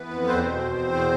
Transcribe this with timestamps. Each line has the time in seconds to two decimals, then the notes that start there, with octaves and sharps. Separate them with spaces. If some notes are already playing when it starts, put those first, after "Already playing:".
Already playing: E3 B3 B4
0.11 F2
0.27 E2 C4 C5
0.45 B2
0.61 E2
0.78 E2
0.94 B2